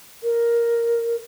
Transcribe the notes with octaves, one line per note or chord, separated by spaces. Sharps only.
A#4